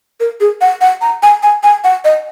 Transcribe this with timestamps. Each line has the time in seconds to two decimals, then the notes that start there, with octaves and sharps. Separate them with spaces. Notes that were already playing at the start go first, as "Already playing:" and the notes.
0.20 A#4
0.41 G#4
0.61 F#5
0.81 F#5
1.01 A#5
1.23 G#5
1.43 G#5
1.63 G#5
1.84 F#5
2.05 D#5